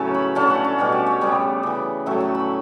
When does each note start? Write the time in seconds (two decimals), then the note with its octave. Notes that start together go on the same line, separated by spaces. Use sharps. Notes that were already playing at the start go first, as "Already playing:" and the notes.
Already playing: A2 C#3 F#3 A3 B3 C#4 A5
0.14 B5
0.35 D3 A3 C#4 A5
0.50 F#5
0.64 A5
0.78 B2 G3 C#4
0.92 D5
1.06 C#5
1.21 C#3 G3 B3 D5
1.63 C#3 E3 B3
2.06 A2 F#3 A3 C#4 E5
2.20 A5
2.35 B5